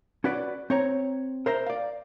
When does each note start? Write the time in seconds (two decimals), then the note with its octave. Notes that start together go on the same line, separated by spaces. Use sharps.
0.24 C#4 F#4 B4 D5
0.70 C4 C#5 A#5
1.46 A#4 C5 E5 A#5
1.66 D5 F5